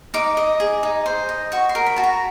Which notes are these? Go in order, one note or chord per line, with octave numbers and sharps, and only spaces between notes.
D#4 D6
D#5
G#4
D#4
C5
D#5
F#4 C#6
C6
A#4
B5
F#4 A5
A#5